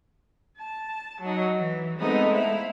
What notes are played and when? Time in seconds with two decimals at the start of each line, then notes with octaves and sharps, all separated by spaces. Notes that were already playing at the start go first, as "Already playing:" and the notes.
0.59 A5
1.21 F#3 D#4
1.56 E3
1.99 G#3 A3 B3 C4 D#4
2.32 E4 F5